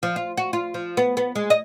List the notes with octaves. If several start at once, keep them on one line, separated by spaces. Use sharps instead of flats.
F3
F4
F#4
F4
F3
B3
B3
G#3
D#5